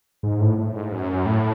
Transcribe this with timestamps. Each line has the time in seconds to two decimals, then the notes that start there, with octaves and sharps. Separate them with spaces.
0.23 G#2
0.41 A2
0.58 A2
0.75 G#2
0.92 F#2
1.26 A2